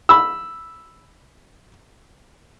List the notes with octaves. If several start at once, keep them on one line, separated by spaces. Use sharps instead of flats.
B5 E6